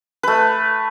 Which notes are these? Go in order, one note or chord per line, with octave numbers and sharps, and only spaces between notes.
A3 B4